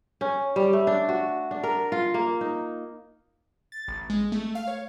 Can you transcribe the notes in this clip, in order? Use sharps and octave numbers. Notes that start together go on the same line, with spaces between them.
C#4
G3
A3
D4
F#4
D4
A#4
F4
A#3
D#4
A6
A1
G#3
A3
F5
C#5